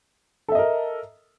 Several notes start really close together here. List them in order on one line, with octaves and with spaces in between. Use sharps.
A4 E5 D#5 A#4